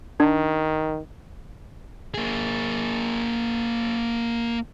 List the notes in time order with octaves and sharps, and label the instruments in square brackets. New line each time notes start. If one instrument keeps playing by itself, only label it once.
[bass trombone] D#3 [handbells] D4
[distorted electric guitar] A#3 G#4